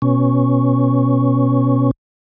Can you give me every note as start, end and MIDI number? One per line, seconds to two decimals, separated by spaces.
0.02 1.91 47
0.02 1.91 61